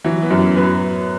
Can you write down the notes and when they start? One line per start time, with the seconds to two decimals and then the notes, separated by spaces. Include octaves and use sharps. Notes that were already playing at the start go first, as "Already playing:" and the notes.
0.04 E3 F#3
0.22 B3
0.30 F#2
0.39 F#3
0.56 F#3 B4